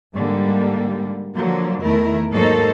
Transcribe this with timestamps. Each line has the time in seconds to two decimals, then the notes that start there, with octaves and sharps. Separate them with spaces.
0.14 G#2 D3 G3 A#3
1.36 D3 F3 F#3 A#3
1.82 E2 D#3 A3 E4 A#4
2.33 G#2 F#3 A#3 D#4 A4 C5